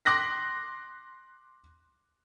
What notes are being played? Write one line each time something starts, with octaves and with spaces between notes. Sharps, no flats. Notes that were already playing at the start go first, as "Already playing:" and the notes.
C6 D6 F#6 A#6 B6